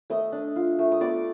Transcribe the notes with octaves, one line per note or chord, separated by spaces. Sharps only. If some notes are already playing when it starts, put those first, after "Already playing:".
A3 D#5 D#6
D4
F4
A3
D#6
B3 D5 D6